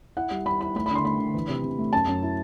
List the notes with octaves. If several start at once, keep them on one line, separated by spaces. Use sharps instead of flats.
E4 F#5
G3
G3 B5
E4 B5
A3 B5
B5
D3
C6
A3 B5
D3
E3
C3
C3
A3
F#2 A5
F#2
E4